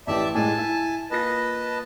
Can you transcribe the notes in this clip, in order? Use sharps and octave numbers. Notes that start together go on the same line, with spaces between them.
A1 E3 G4 D5 E5 A5
A2 G#3 G#5 A5
E4
A#3 F4 B4 D#5 A5 A#6